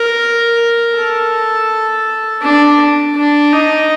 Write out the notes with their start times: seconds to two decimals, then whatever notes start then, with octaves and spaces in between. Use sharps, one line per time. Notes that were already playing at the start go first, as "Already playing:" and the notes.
Already playing: A#4
0.95 A4
2.42 D4
3.16 D4
3.53 D#4